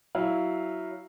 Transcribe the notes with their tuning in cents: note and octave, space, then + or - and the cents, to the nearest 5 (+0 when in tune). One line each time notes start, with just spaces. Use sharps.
F#3 +10 E4 +0 F5 +0